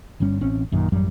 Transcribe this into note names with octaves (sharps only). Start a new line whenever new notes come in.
G1 G2 G3 C#4
A1 C4 C#4
A#1 F#2 A#2 D#3
A1 F#2 F#3 G3